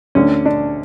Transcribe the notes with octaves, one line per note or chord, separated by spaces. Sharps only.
D2 D3 C#4
D4